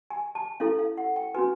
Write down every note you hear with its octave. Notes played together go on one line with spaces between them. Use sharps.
G#5
A5
C#4 E4 A4 F5
F5
F#5
G5
C#4 F#4 B4 G#5